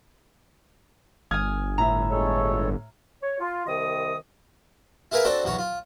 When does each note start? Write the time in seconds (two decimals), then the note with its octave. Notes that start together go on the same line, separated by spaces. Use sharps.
1.31 G1 G#5 D#6 F6 G#6
1.78 A2 E5 A#5
2.11 G#3 A4 C#5
3.23 C#5
3.40 F4
3.67 C2 D#3 D#5 D#6
5.12 E4 G#4 A#4 B4 F5
5.25 C4 D4 F#4 A4
5.44 B1 E2 F#4 C#5
5.59 F4